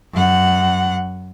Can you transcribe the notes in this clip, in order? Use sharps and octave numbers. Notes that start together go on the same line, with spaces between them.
F#2 F#5